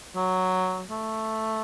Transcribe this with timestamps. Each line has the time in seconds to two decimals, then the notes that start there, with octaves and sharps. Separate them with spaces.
0.16 F#3
0.91 A3